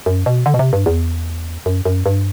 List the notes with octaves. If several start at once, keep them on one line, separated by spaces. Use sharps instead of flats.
F#2
B2
D3
B2
C3
G2
E2
F#2
F#2
G2